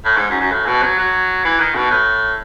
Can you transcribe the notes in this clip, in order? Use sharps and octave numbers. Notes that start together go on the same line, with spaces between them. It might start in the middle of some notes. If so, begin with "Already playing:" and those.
A2
G#2
F#2
F#2
A2
B2
F#3
F#3
E3
D#3
B2
A2